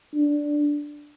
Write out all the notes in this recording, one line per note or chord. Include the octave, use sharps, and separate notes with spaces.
D4